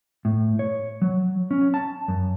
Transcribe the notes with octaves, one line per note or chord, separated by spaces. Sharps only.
A2
C#5
F#3
C#4
A5
F#2